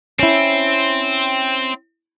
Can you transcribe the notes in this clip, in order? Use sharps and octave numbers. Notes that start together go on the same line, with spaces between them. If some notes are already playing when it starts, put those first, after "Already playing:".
C4 C#4 E4